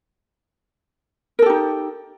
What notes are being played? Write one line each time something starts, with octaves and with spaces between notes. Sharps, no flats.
D#4 G4 A4 A#4